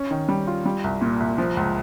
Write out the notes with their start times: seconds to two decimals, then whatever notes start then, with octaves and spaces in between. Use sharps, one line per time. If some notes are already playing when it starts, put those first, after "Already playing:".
Already playing: C#4
0.11 D#3
0.29 G3
0.47 F4
0.65 G3
0.84 C2
1.01 A#2
1.20 C2
1.38 F3
1.57 C#2